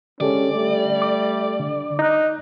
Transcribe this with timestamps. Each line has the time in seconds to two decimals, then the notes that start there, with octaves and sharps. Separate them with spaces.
0.21 D3 G#3 C#4 G4 A4 D5
0.53 G3 A3
1.02 D6
1.60 D3
1.99 D#4 A#5 F#6